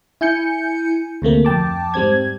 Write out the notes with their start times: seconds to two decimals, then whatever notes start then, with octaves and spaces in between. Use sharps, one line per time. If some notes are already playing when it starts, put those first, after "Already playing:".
0.21 E4 G#5 G6 C#7
1.22 D2 C3 A3 A#3
1.45 F2 G5 A5 D6
1.94 G#2 G3 C4 G#6